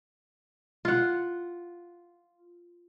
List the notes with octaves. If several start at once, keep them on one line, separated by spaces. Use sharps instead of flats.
F4 F#5